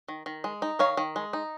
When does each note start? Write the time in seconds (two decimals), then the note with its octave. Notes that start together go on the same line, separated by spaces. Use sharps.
0.08 D#3
0.26 D#3
0.44 G#3
0.62 D#4
0.79 D#3 C#5 F5
0.97 D#3
1.16 G#3
1.33 D#4